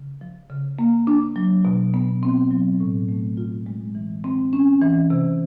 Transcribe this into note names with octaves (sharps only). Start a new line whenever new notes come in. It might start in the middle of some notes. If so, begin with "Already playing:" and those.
Already playing: C#3
F3
C#3
A#3
D4
F#3
B2
B3
C4
F#3
A2
A3
F4
G#3
E3
C4
C#4
E3
C3